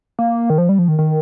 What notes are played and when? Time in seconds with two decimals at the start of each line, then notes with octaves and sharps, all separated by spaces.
0.19 A#3
0.50 D#3
0.58 F3
0.69 G3
0.79 F3
0.88 D#3
0.99 D#3